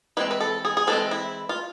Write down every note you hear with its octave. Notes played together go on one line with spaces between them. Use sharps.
E3 G#3 C4 B4
B4
A4
G#4
G#4
E3 G#3 C4 A4
E4
F4